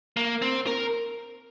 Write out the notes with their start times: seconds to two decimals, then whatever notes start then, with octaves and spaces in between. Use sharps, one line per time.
0.17 A#3
0.42 C4
0.67 A#4